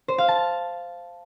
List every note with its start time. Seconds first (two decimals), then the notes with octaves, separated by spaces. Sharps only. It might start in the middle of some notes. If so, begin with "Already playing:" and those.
0.08 C5
0.18 F5
0.28 A5